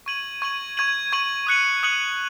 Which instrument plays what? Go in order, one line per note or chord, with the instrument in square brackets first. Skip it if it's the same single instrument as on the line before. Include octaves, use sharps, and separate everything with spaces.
[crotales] C#6 G#6 D#7 F#7
C#6 G#6 D#7 F#7
C#6 G#6 D#7 F#7
C#6 G#6 D#7 F#7
D#6 F#6 C#7 F#7
D#6 F#6 C#7 F#7